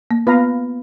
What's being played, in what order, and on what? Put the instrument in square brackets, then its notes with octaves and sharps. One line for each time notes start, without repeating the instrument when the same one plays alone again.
[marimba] A#3
[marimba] B3 [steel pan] F4 B4 F5 A#5